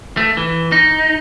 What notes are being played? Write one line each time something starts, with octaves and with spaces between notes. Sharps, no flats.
A3
E3
D#4